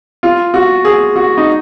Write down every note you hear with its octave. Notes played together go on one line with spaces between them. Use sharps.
F4
F#4
G#4
F#4
D#4